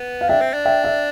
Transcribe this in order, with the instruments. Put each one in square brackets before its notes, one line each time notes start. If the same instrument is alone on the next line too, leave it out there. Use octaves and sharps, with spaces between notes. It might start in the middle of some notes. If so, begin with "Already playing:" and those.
Already playing: [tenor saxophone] B3
[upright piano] F5
[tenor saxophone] D4 [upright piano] E5 G5
[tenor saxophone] C4
D4
[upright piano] E5 G5
E5 G5